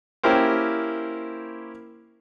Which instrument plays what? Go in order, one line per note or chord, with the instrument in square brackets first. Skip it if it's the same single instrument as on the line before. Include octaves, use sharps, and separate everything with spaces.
[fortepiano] A#3 C#4 E4 G4 A#4 C5